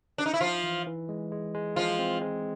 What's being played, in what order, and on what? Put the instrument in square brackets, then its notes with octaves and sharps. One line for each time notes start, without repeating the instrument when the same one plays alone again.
[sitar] D4
D#4
E4
[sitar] F3 F4 [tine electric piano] D#4
[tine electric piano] E3
E3
G#3
G#3
G#3
[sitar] F3 F4 [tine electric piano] G#3
[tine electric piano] C4
G#3